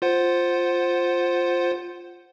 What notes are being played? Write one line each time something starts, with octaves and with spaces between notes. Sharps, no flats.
F4 C5 F#5